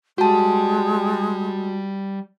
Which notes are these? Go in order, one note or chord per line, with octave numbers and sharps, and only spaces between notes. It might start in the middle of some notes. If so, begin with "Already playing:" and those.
G3 G#3 F#4 G4 A5